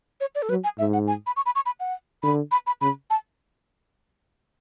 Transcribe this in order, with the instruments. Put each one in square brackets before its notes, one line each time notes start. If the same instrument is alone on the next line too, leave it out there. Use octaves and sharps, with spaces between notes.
[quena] C#5
D5
A4
[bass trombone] F#3 [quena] B4
[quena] G#5
[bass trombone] G#2 [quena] E5
[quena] F#5
G#5
B5
C#6
B5
C#6
B5
F#5
[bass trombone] D3 [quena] B5
[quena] B5
B5
[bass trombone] C#3 [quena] B5
[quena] A5